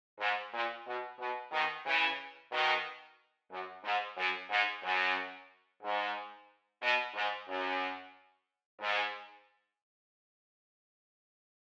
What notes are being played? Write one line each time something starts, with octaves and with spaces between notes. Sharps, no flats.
G#2
A#2
B2
B2
B2 D#3
C#3 E3
B2 D#3
F#2
G#2
F#2
G#2
F#2
G#2
B2
G#2
F#2
G#2